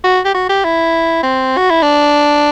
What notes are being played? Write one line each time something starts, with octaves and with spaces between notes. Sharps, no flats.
F#4
G4
F#4
G4
E4
C4
F#4
E4
D4